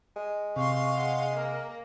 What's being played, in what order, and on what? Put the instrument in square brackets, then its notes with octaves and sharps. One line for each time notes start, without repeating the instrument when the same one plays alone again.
[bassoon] G#3
[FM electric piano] C3 [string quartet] F5 C6 [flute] C#6
[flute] F#5
[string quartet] A#3 [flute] A#4